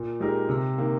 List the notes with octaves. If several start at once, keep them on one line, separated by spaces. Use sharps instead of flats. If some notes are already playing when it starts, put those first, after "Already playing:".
Already playing: A#2
G#3 D#4 G4 A#4
C3
D#3 A#3